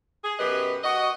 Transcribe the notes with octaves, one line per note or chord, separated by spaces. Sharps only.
G#4
F#2 B2 G4 B4 D#5
F#4 D#5